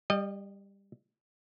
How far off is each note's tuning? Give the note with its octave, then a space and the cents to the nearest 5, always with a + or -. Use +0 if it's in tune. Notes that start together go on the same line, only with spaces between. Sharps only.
G3 +15 D#5 -25